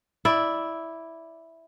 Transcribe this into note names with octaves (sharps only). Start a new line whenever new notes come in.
E4 D5